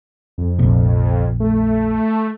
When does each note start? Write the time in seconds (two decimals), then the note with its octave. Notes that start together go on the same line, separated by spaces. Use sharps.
0.38 F2
0.59 F1 A#1 C3
1.40 A3